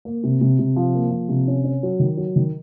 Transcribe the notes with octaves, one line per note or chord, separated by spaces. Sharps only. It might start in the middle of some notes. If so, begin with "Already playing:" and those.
A#3
C3
C3
C3
F3
A#3
F3
C3
C#4
C#4
F#3
D#3
F#3
D#3